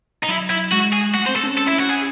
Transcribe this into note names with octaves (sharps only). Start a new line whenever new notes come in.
D#4
F#3 E4
E4
G#3 F#4
G#4
A3 F#4
C4 C5
A4
C#4
A4
E4
F#4
G#4